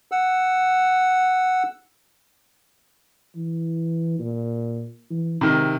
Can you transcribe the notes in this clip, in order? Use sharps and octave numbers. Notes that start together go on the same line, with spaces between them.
F#5 E6
E3
A#2
E3
G#1 C3 D#3